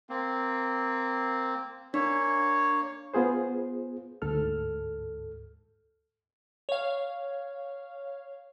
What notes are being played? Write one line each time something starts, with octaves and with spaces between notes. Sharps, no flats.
A#3 C4
A#3 D4 C#5
B3 F4 G#4 C5
D2 G#2 A4 F6
C#5 F5